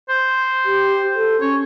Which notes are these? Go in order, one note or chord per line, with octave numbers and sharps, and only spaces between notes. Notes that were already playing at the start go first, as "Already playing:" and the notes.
C5
G4
A4
C#4 C#5